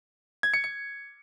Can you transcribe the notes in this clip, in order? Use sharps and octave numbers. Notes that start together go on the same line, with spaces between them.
G#6
C#7
C#7